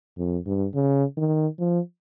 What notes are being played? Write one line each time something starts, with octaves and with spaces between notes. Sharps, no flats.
F2
G2
C#3
D#3
F3